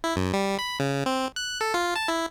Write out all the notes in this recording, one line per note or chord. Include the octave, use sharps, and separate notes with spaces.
E4
F#2
G3
B5
C#3
C4
F#6
A4
F4
A5
E4